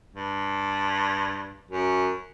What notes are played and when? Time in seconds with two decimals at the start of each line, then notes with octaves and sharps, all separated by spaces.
0.15 G2
1.71 F#2